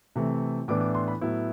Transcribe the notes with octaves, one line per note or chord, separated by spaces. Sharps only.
C3 E3 A3
A2 E3 B3 D4 D6
D6
C6
B5
A2 F#3 B3 E4